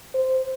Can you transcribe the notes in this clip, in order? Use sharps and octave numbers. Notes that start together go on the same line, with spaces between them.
C5